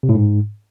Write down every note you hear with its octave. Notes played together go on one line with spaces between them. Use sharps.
C3
A2
G#2